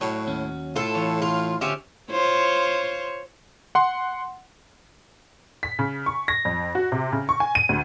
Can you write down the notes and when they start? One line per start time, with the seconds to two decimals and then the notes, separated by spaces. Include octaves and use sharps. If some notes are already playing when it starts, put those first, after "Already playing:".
0.01 A2 F#3 C#5
0.27 D#2 C#4
0.76 A2 F4 A4
0.95 E3 C#5
1.22 F4
1.61 D3 C#4 F4 G4 C5 E5
2.10 F4 C5 C#5
3.75 F#5 C6
5.63 B6
5.79 C#3
6.06 C#6
6.28 A#6
6.45 F2
6.75 F#4
6.92 C3
7.12 C#3
7.29 C#6
7.40 G#5
7.55 D#7
7.69 D2